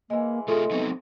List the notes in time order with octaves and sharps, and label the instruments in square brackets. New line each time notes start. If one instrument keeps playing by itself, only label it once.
[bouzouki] E3 G#3 [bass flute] A#3
[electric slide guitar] A3 F4 [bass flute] G#4 [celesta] A4 E5 C6
[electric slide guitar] F#3 C4 D#4 [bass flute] B3